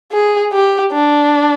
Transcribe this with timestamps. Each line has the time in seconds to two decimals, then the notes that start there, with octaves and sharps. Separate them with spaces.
0.12 G#4
0.52 G4
0.93 D4